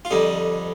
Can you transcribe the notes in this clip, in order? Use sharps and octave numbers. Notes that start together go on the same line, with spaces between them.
F4
F2 D3 G3 D#4